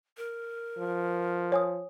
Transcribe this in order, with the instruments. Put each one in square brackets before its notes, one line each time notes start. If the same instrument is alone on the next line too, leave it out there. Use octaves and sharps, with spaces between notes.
[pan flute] A#4
[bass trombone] F3
[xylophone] C#5 G#5 D#6